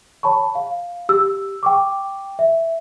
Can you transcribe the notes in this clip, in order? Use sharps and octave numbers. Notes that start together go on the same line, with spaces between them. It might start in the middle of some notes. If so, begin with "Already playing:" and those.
C#5 A5 B5 C#6
F5
G4 E6
G5 C#6 D6
E5